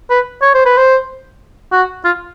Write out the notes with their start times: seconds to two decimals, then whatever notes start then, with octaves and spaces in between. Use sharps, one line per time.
0.10 B4
0.42 C#5
0.54 C5
0.66 B4
0.77 C5
1.72 F#4
2.04 F4